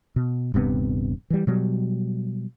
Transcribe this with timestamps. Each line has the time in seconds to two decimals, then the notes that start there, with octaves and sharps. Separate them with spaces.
0.16 B2
0.54 D#1 G2 C3 B3
1.30 E3 G3
1.47 B2 F#3 G3